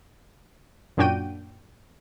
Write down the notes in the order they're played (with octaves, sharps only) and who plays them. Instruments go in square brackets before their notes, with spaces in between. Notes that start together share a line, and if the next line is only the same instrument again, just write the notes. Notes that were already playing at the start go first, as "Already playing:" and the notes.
[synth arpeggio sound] F#2 A#2 D4 F#4 G5 D#7